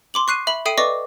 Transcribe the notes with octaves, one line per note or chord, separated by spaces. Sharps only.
C6 D6 F#7
C#6 F#6 C7 D#7
E5 B5 F#7
A4 E5 G5 D#6 C7 D#7
B4 D5 D#5 C#6 D6 A#6